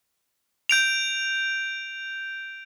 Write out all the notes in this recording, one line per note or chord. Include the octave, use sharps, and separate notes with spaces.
G6 D7 F7